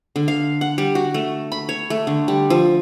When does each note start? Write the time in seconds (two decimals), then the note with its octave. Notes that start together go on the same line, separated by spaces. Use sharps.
0.16 D3
0.28 F5
0.61 F#5
0.78 G3
0.95 F#4
1.14 A3
1.52 B5
1.69 C#5
1.90 A3
2.07 D3
2.28 G3
2.50 F3